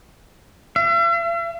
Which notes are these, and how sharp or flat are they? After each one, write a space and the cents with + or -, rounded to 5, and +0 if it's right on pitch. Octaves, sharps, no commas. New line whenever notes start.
E5 +45